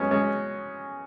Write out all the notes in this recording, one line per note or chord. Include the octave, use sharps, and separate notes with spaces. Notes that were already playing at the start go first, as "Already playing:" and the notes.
Already playing: F#3 G#3 B3 C#4
G#3 C#4